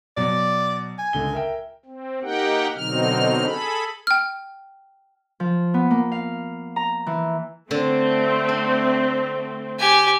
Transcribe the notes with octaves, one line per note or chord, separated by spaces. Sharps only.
B2 F#3 D5
G#5
C#2 D3 G7
A#4 E5 G5
C4
A#3 D#4 G4 A#4 F#5 G5
B2 D3 F#3 C4 D#4 F6
G#4 A4 B5
G5 F6
F3
B3
A#3
F5
A#5
E3
D3 A3 C4
D4
G4 G#5